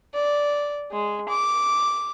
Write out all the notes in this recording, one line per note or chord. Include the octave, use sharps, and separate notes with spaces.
D5
G#3
D6